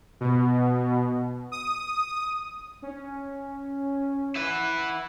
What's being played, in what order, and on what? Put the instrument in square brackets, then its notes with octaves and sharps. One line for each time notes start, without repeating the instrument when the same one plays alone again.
[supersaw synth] B2
D#6
[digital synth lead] C#4
[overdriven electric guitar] E4 B4 [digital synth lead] F#5